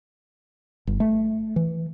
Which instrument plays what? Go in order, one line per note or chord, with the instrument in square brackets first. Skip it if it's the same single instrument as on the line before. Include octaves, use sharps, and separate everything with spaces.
[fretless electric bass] G1
A3
E3